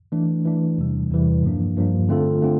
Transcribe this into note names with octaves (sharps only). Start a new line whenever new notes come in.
E3 A3 D4
E3 A3 D4
E2 C3 E3 G3
E2 C3 E3 G3
G2 F3 A#3 D4
G2 F3 A#3 D4
D3 A3 C4 F4 A4
D3 A3 C4 F4